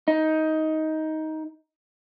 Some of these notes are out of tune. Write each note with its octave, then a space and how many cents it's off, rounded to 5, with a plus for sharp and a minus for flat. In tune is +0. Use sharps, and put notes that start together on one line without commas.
D#4 +15